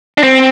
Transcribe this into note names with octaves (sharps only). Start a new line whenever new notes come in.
D4
C4